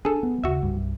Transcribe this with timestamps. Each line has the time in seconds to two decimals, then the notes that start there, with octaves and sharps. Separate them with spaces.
0.05 D4 G#4 A4
0.23 B3
0.44 D#2 C#3 F#4 E5
0.62 C2 G2 G3